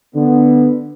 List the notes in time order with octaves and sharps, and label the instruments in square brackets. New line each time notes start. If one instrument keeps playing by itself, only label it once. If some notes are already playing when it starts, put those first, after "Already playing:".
[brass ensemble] D3 B3